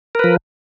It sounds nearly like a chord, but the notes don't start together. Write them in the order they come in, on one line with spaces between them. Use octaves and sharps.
A#4 B4 F3